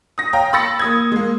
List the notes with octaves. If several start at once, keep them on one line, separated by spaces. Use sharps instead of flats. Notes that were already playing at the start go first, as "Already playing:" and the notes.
D#6 A#6
C#5 F5 G5 A#5
B5 E6 A6 A#6 C#7
A#3 D#6 G#6
G#3 A#3